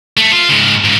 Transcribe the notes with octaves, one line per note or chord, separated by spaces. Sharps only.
A3
F4
G#2 C#3
G#2 C#3